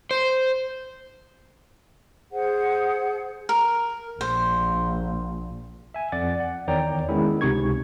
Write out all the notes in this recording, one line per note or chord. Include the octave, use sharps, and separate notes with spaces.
C5
G#4 C5 F#5
A#4
A#1 C5
E5 G#5
F2 D5 F#5 A6
F#5
E2 D#3 C#5 D5 G5 A#5
D#3 G#3 B3 C#4 E4
C#2 C3 D#4 C#6 G#6